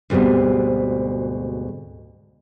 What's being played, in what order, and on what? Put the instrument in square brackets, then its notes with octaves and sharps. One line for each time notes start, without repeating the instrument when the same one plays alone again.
[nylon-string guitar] D2 G#2 B2 G3 C4